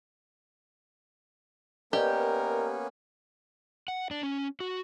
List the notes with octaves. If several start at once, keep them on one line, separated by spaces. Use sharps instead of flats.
A#3 B3 C#4 G4 A#4 B4 D5 D#5
F#5
D4
C#4
F#4